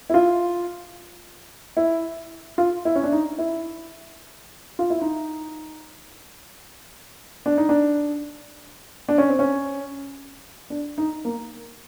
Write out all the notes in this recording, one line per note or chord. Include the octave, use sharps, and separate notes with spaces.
E4
F4
E4
F4
E4
C#4
D4
D#4
E4
F4
E4
D#4
D4
D#4
D4
D4
C#4
C4
C#4
D4
D#4
A#3